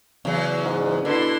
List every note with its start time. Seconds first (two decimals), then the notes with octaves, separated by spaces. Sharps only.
0.25 E2 C#3 F#3
0.65 G#2
1.05 B2 D3 E4 C6